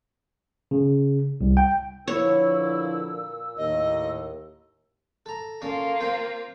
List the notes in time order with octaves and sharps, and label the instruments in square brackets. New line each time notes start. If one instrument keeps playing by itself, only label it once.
[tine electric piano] C#3
C2
G5
[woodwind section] A#2 E6 [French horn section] D3 F3 B4 [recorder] E4 [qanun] C#5
[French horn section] D#2 A2 [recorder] D#5
[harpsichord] A4 A#5
[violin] A#3 F4 [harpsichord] C#4 A4
[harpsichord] C4 G5